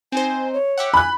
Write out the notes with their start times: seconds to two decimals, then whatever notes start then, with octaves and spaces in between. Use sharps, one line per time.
0.12 C4 D#4 C5 G#5
0.53 C#5
0.78 G4 E5 F#5
0.94 G#5 B5 F#6